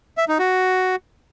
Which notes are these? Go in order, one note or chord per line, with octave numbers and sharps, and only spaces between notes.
E5
D#4
F#4